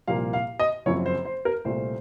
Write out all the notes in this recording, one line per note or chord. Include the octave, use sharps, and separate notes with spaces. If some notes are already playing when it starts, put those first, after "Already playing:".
C2 A#2 F3 A#3 F5
F5
D#5
F#1 F#2 F3 C4 C#5
C5
C5
A#4
C2 A#2 A3 C5